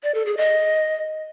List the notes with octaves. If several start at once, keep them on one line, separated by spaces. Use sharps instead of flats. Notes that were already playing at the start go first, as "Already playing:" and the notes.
D5
A4
G#4
D#5